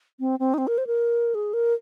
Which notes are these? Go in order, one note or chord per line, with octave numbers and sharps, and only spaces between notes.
C4
C4
D#4
C4
A#4
C5
A#4
G#4
A#4